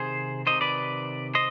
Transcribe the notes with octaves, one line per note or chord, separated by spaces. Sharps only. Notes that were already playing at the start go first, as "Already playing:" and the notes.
Already playing: C3 D#3 G#4 C5
C3 D#3 C5 D#5
B4 D5
C5 D#5